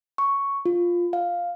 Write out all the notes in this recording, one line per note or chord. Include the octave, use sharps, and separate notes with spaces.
C#6
F4
F5